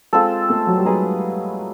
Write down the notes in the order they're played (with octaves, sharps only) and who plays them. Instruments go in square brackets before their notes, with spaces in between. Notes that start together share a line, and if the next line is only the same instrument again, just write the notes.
[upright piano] G#3 [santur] C4 F4 A4
[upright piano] A3
F#3
G3
[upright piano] G#3 [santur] D#4 G#4 B4 D#5